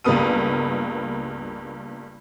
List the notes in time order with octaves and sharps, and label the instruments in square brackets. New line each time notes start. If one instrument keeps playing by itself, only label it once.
[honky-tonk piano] C#2 G2 A#3 B3 D#6 D#7